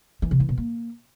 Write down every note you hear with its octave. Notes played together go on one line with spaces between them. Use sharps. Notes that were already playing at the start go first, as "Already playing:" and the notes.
E3
C3
E3
B2
A#3